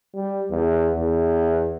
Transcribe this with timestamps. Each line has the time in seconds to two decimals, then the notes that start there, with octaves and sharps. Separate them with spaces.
0.14 G3
0.50 E2
0.94 E2